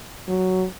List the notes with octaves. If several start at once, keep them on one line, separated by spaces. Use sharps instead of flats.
F#3